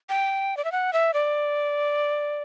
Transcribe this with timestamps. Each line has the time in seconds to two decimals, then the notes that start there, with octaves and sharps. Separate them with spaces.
0.09 G5
0.57 D5
0.65 E5
0.72 F#5
0.93 E5
1.14 D5